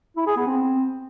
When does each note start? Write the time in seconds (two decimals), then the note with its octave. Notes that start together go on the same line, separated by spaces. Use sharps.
0.17 E4
0.27 G#4
0.37 B3
0.47 C4